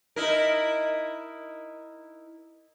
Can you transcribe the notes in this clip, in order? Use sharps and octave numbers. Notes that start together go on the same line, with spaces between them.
D#4 E4 A#4